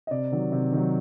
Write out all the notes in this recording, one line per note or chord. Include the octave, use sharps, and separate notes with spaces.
D#5
C3 D5
D#3 F#3
C3
D#3 F#3